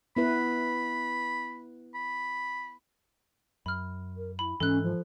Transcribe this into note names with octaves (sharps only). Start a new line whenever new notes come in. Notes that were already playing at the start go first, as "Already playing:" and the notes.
B3 E4 B4 B5
B5
F#2 B5 F6
A#4
E4 B5
G#2 E3 C#4 A4 F#6
F3